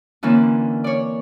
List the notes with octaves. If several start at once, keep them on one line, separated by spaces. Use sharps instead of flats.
D3 E3 A#3 C4 C#4
C#5 D5